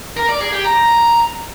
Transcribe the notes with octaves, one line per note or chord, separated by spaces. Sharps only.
A#4
D5
G#4
G4
A#5